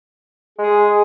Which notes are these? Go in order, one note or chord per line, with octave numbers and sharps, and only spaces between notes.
G#3 G#4